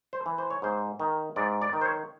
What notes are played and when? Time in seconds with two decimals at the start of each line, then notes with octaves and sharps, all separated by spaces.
0.13 C5
0.26 E3
0.38 C5
0.50 C#5
0.62 G#2 C5
1.00 D#3
1.36 G#2 D5
1.62 D5
1.73 D#3
1.81 C5
1.85 C#5